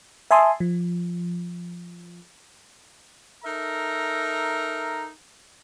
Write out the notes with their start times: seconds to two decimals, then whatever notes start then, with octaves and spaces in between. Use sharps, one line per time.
0.31 E5 G#5 A5 C6 D#6
0.60 F3
3.44 D#4 A4 A#4 E5 A#5